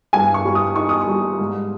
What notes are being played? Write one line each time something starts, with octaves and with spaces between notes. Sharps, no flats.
G2 G#5
C#6
G3
D#6
D#4 C#6
D#6
C#6
G3
G#2